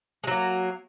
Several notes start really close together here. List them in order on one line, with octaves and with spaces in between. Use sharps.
G#3 F#3 A#3